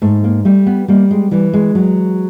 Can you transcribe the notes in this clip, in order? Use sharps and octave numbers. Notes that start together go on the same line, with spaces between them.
G#2 A3
A#3
G3 A3
B3
G3 A#3
G#3
E3 G3
G#3
F#3